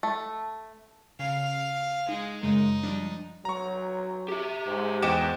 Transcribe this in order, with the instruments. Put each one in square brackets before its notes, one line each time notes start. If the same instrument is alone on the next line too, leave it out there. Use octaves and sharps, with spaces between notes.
[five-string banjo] A3
[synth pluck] C#3 [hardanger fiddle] F5
[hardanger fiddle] G#3 [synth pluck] D#4
[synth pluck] F#2 C#3 G#3 [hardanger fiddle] D#4
[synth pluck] F3 G3 D4
[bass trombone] F#3 [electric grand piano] A#5 C#6
[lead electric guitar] G4 E5
[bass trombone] G#2
[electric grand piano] E2 D#5 E7 [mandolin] F#4 G4 D6